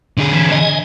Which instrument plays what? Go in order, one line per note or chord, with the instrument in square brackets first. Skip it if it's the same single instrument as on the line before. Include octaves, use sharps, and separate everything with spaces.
[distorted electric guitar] D3 G#4
[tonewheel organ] E3
D#5 G#5